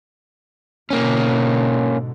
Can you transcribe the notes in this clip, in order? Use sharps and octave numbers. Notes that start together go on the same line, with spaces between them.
G#2 B2 D3 A#3 C#4